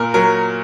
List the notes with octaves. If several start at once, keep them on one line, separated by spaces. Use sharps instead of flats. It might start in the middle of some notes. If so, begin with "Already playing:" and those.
Already playing: A#2 A#3 A#4
F#3 A#4